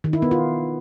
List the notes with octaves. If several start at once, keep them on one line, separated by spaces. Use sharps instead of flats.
D#3
E4
B3
F4